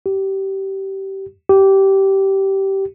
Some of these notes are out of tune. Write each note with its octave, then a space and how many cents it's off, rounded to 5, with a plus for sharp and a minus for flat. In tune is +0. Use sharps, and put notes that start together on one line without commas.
G4 -20
G4 -15